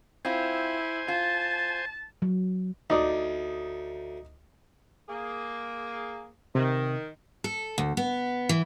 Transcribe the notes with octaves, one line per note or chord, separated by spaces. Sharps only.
C4 E4 F4 C5 G#5
F4 A5
F#3
D2 D#4 D5 D#6
A#3 G#4
C3 D#3
A4
D2
B3
E3